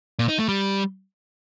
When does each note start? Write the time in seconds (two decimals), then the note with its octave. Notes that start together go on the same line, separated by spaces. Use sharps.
0.19 A#2
0.29 D#4
0.39 A3
0.49 G3